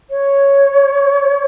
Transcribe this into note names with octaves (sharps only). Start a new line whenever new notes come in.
C#5